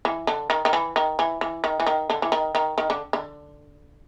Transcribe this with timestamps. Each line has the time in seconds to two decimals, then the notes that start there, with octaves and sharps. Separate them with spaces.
0.05 E3
0.27 D3
0.50 D#3
0.65 D#3
0.73 E3
0.96 D#3
1.19 E3
1.41 E3
1.64 D#3
1.80 E3
1.87 D#3
2.10 D3
2.22 E3
2.32 D#3
2.55 D#3
2.78 D#3
2.90 D3
3.13 D3